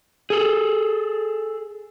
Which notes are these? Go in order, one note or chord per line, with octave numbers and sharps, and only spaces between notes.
G#4 A4